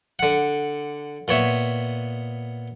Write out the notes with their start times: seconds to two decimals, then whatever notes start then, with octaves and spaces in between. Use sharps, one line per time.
0.19 D3 F#5
1.28 A#2 B3 C#5 E5